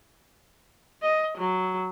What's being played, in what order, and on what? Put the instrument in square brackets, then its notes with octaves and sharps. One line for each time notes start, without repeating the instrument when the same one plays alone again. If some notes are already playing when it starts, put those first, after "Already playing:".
[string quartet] D#5
F#3